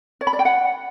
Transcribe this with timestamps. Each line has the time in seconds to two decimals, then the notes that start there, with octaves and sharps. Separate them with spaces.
0.21 C#5
0.27 B5
0.33 D5
0.39 G5
0.45 F#5